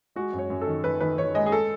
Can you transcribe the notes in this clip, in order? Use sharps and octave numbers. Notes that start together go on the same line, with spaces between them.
G#3 F#4
F#2
C#5
F#2
A4
D#3
D#3 B4
D#3 B4
D#3 C#5
G#3 D#5
G#4
A4